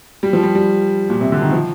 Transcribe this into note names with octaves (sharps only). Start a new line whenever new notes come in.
G3
F3
G3
G3
A#2
C3
D3
D#3
F3